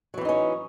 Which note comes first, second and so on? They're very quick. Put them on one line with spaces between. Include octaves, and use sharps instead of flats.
F#3 E3 C4 D#4 C#4